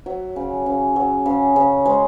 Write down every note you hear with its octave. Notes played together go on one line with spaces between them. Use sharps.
F#3 E5
C#3
C#3
F#3
C#3
C#3
G#3 C5